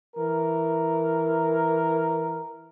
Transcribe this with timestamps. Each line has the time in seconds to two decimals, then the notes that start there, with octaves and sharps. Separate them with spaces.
0.16 E3 A#4